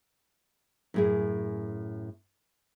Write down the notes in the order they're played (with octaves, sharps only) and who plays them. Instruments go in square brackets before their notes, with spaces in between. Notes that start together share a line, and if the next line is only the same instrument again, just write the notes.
[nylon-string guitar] F#2 A2 G#4